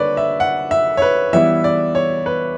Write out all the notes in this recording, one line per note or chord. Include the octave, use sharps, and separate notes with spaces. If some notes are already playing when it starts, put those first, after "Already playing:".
Already playing: D3 G3 A#3 B4 C#5 D5
E5
F#5
E5
C#5
B4
E3 G3 B3 E4 E5
D5
C#5
B4